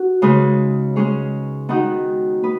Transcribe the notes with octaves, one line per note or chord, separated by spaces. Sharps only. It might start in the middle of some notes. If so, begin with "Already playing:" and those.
Already playing: F#4
C#3 G#3 D#4 G#4 B4
G#3 C#4 G#4 C#5
D#3 B3 D#4 F#4
B3 B4